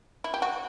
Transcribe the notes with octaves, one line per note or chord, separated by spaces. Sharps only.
E4
G4
F#4